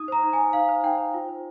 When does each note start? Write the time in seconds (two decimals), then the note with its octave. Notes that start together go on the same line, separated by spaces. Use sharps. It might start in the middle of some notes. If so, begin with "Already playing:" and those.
Already playing: D#4 D#6
0.08 C5 A#5
0.23 D#4
0.33 G#5
0.39 C5
0.53 D#4 F5
0.69 C5
0.83 D#4 G5
0.98 C5
1.14 F4
1.29 C5